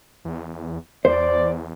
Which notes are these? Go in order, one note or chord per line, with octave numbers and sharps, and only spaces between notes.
E2
E2 C5 D5